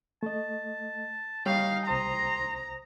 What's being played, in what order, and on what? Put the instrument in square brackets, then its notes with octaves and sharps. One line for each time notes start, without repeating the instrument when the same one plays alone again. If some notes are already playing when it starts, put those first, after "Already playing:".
[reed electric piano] A3 D#5 [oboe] A5
[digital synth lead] G3 [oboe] D#4 [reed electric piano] C#5 [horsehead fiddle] F5
[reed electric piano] C2 C5 D#6 [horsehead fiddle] A#5 [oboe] C6